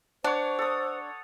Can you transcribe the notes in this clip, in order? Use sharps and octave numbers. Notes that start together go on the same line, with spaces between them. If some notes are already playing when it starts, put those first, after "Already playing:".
D4 C5 C#5 F#5
A4 D#6